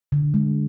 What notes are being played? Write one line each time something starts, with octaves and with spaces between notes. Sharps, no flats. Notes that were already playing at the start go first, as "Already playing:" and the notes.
D3
G#3